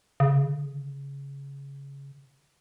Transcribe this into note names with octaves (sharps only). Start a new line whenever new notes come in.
C#3
D3
C#3